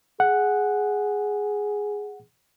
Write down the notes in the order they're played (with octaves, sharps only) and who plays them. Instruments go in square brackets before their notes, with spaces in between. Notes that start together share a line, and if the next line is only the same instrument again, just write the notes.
[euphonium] G#4 [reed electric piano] F#5